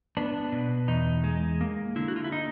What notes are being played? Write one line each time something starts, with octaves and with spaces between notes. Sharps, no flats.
B3 D4
B2
E2 D#4
G#3
A#3
D3 E4
F#4
F4
E4
D#4